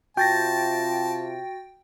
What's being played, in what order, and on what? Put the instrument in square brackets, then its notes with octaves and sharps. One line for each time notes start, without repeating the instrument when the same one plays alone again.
[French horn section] C3 F4 [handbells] F#4 A6 A#6 [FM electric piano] G5 [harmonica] A5